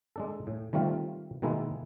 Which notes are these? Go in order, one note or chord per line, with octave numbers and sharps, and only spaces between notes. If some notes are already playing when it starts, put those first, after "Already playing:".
G#3 D4 A4
A2
D#3 G3 A3 C4 F4
B2 D#3 G#3 A#3 E4